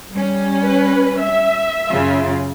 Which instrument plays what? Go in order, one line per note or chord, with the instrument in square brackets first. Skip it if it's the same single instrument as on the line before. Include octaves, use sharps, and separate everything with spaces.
[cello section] G3 C#4
[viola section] B4
E5
[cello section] F#2 C#3 F4